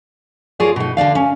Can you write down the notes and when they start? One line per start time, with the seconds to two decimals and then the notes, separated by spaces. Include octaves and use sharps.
0.60 F4 G#4 A#4 C#5 D5
0.76 B2 D#4
0.97 D3 D4 D5 F5
1.15 C#4